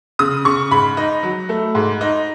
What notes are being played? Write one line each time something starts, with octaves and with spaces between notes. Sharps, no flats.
C#3 D#6
C#3 C#6
G#2 B5
D#4
F#3
A3
G#2
D#4